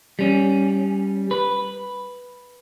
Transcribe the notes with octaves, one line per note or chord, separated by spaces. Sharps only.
G3 C#4
B4